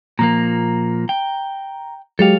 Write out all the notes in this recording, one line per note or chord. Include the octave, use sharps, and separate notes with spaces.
A#2 F3 A#3 A#5
G5
F#3 G#3 G4 A4 C#5 F5